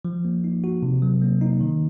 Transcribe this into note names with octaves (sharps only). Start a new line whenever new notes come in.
F3
A#3
D#4
F#4
C3
F#3
A#3
D#4
D#3